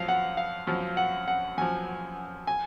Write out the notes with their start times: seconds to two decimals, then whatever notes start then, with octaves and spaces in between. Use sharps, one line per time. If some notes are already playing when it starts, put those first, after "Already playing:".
Already playing: F#2 F3 F5
0.08 F#5
0.37 F5
0.67 F#2 F3
0.97 F#5
1.28 F#5
1.57 F#2 F3 G#5
2.47 G#5